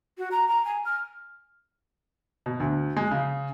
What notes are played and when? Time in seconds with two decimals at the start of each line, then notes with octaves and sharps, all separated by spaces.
0.18 F#4
0.31 A#5
0.48 A#5
0.65 G#5
0.85 F6
2.46 B2
2.60 D2
2.97 G#3
3.11 C#3